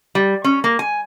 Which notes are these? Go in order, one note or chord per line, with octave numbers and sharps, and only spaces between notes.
G3
C#4
A#3
G#5